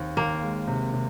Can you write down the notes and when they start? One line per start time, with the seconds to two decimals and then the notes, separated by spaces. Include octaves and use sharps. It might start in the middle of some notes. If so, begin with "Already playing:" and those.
Already playing: D#2 C4
0.17 D#2 A#3
0.43 G#3
0.67 C3
0.94 C3